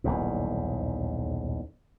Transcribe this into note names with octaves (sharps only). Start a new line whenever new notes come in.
D#1 B1 E2 G#2